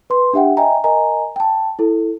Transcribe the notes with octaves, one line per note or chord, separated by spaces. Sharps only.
B4 C6
D4 G4 E5 F#5 G5
D#5 E5 G5 G#5 A#5
A#4 D#5 G#5 A#5
G5 A5
E4 A4